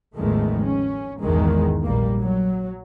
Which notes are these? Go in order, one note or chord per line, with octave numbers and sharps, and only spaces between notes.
A1 E2 D#3 F3 G#3 A3
C#4
A#1 E2 G#2 D#3 E3 G#3
A#1 G3 A#3
F#3